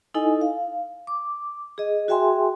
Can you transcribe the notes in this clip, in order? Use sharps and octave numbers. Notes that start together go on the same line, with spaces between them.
D#4 E4 A4 D#5 G#5
F5
D6
G#4 D#5
F#4 G#4 E5 G5 G#5 C6